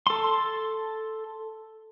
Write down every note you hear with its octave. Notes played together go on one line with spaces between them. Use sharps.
A4 C6